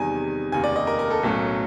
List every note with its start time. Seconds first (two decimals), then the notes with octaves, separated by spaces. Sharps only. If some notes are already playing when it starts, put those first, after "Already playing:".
Already playing: E2 C3 D#3 G3 G#5
0.52 F1 D#2 C#3 G#5
0.64 D5
0.76 D#5
0.87 A#4
0.99 A#4
1.11 A4
1.23 B1 A2 F#3 A3 C#4